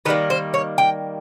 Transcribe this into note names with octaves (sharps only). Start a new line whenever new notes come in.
D#3 G3 A#3 B4
C5
C#5
G5